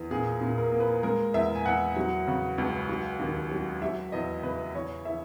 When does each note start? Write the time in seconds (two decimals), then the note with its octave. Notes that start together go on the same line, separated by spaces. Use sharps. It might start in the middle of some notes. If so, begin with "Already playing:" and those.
Already playing: E2
0.11 A#2 G#4
0.41 A#2
0.58 A#4
0.72 A#3
0.80 B4
1.03 G#3 A#4
1.34 E2 E5
1.55 G#5
1.66 E2 F#5
1.96 F#3
2.27 C#3
2.58 C#2
2.89 F#3
3.19 D#2
3.51 F#3
3.82 F#3 E5
4.12 E2 D#5
4.43 C#3 B4
4.75 E2 C#5
5.05 E3 E5